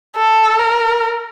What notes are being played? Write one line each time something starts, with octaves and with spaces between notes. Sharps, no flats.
A4
A#4